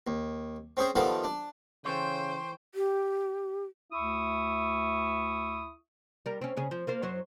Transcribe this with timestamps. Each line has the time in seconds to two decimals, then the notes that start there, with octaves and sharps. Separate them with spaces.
0.07 D#2
0.77 C4 C#4 G#4 C5
0.96 D#3 F3 G3 B3 F4 A4
1.24 D4
1.85 C#3 E3 A4 C5 C#5 G5 C6
2.75 G4
3.92 D2 E4 E5 C#6 D#6
6.26 G3 A#4
6.41 C4 C#4
6.57 C#3 C#4 G#4
6.71 F3
6.87 A#3 F4 C5
7.02 F#2 F#3 C5